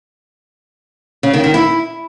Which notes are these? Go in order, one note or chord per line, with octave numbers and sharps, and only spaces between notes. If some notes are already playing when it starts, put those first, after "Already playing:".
C#3
D#3
D#3
E4